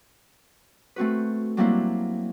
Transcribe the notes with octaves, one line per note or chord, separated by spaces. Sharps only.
A3 C4 F#4 B4
F#3 G3 A#3 C4 D4 E4